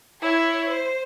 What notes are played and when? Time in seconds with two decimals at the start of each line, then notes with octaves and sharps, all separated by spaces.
0.21 E4 C#5
0.68 C5